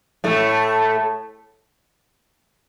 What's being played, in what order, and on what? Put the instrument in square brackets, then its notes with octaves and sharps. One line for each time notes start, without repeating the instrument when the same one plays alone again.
[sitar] A2 A3